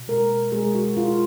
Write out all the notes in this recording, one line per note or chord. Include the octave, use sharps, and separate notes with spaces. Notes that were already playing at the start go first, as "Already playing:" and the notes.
Already playing: B2
G#3 A#4
G#3 G#4
F#4
G#3 F4